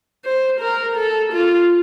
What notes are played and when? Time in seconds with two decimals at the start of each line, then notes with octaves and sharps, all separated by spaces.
0.25 C5
0.60 A#4
0.96 A4
1.33 F4